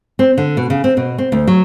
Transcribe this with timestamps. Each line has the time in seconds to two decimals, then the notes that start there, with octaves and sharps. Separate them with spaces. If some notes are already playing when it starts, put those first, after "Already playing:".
0.19 C4
0.38 D3
0.57 B2
0.70 C#3
0.84 C4
0.97 B2
1.18 C4
1.32 D2
1.47 F#3